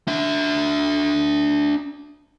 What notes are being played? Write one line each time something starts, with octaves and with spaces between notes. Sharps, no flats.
D4 E5